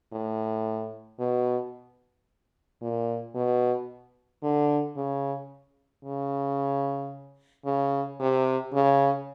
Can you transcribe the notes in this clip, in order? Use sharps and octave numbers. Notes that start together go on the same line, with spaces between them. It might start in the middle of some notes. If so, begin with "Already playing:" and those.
A2
B2
A#2
B2
D3
C#3
C#3
C#3
C3
C#3